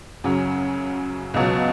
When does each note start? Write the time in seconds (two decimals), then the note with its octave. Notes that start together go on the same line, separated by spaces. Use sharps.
0.24 F#2 C#3 F#3
1.34 C#2 B2 F#3